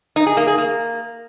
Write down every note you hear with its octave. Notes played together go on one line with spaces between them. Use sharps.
D#4
G#4
A#3
G#4
A#3